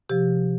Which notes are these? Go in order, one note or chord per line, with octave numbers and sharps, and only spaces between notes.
C3 F3 G4